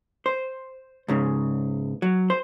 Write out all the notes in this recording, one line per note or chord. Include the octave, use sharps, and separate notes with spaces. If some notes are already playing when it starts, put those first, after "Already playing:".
C5
C#2 G#2 C#3
F#3
C5